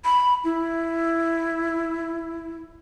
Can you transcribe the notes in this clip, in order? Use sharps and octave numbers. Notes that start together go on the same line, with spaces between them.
B5
E4